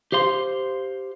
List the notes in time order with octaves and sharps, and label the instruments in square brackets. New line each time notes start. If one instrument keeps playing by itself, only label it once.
[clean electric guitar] G4 C5 F5 C6